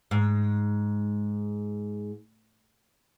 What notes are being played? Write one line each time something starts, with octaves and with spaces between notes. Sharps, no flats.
G#2